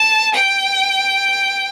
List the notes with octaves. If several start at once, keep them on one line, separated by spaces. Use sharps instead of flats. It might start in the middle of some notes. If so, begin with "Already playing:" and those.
Already playing: A5
G5